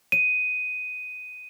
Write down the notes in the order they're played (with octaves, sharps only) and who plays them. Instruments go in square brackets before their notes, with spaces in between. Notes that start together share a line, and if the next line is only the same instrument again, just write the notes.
[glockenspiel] D#7